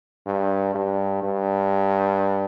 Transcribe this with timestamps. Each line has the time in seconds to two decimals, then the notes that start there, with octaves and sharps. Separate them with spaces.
0.26 G2
0.75 G2
1.23 G2